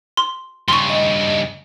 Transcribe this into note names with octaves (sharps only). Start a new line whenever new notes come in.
C6
G2 C#3 C6 C#6
D#5